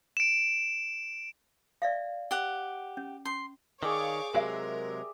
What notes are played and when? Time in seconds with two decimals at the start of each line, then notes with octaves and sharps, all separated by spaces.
0.17 D7 E7
1.82 D5 E5 F5
2.31 G4 F#5
2.97 C#4
3.25 C#4 C6
3.83 D#3 G#4 C#5 D5 F5 G5 D6
4.35 C3 F#3 G#3 G4 A#4 E5